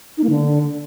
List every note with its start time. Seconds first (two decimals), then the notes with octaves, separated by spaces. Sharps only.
0.17 D#4
0.23 A#3
0.29 D3